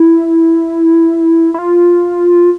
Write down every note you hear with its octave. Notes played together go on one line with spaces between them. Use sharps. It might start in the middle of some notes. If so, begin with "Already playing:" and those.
Already playing: E4
E4
F4